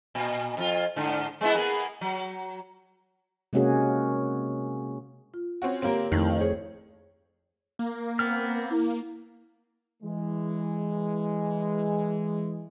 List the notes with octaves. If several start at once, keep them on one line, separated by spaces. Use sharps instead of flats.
A#2
F2 F4
G#2 D3
G#3 B3 E4
A#3 B3 G#4
F#3
C3 G#3 A#3 C#4 F#4 G#4
F4
C4 C#4 F#4
D3 A#3 C4 G4 A#4 C#5
F2 D#3 A3 E4
G#4 C#5
A#3
B3 C4 F6
E4
E3 G#3